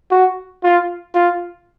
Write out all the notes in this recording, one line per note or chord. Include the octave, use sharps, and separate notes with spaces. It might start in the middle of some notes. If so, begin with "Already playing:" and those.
F#4
F4
F4